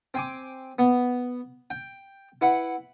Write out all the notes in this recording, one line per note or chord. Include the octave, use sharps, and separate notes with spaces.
C4 G#5 D6
B3
G5
E4 B4 F#5